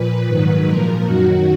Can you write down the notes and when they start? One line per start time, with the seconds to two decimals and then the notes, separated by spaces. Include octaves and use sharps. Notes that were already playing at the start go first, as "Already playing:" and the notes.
Already playing: A#2 F3 B4
0.27 G#2 D#3 F#3 B4
0.66 A#2 F3 A#4
1.04 F#2 D#3 F#3 F#4